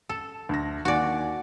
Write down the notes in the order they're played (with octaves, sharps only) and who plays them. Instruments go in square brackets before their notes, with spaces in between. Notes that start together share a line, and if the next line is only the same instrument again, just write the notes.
[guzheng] A4 [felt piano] E7
[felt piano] D2 A#6
[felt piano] D#2 G#5 [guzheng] F#4 D5